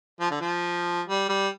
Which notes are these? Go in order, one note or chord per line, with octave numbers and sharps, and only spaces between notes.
F3
D3
F3
G3
G3